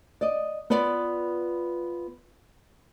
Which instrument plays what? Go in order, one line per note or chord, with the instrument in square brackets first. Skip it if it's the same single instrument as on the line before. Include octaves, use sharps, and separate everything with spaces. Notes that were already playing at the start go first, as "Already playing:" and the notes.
[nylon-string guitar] D5 D#5
B3 F4 B4 D5